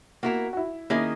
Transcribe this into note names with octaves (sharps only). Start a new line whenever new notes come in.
A#3 E4 F#4 A#4
F#4
E4
D#3 A#3 C#4 E4 G#4 D#5